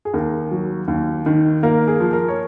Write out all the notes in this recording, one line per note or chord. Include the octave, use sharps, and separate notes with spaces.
G#4
D#2 A#4
F#3
D#2
D#3
A#3 A#4
G#4
F3
A#4
C#5